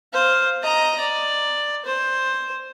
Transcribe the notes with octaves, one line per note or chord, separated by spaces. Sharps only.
C5 F5
D#5 A#5
D5
C5